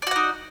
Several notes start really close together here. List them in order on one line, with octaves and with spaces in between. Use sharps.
D5 F#4 F#5 D#4